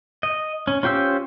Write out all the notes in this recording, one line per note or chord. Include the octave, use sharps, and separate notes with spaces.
D#5
C#4
C#4 F4 G4 C5 E6